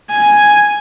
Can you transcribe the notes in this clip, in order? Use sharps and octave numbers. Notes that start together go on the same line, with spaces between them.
G#5